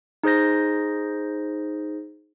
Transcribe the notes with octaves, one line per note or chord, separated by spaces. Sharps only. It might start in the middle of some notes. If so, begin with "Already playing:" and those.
D#4 G#4 C5 G6 A#6